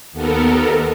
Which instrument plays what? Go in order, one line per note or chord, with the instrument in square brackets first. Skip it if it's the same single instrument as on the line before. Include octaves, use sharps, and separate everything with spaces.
[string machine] D#2 B3 A4 A#4